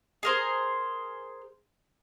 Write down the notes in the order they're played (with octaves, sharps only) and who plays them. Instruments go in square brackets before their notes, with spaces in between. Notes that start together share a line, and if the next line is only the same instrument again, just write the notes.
[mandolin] G#4 A#4 C5